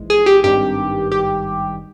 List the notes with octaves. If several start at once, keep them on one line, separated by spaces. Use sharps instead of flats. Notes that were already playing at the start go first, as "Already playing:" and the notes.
Already playing: A#1 G#2 E3 G#3
G#4
G4
G#1 G2 D#3 G4
G4